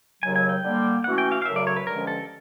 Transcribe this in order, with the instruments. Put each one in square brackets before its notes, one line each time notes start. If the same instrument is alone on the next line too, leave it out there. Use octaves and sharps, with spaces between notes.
[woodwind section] D#2 C#3 F#3 [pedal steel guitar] G#5
[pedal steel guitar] G#5
G5
[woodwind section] D3 G3 A#3
[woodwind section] E3 A3 C#4 F#4 [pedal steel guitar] F#5
[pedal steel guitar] G5
F5
F5
[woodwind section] F#2 C#3 F#3 A3 [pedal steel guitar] E5
[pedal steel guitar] D5
C#5
B4
[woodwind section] G2 D3 F3 G#3 C#4 [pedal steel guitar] A#4
[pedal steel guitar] A4